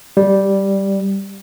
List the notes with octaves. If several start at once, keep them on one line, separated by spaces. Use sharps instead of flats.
G3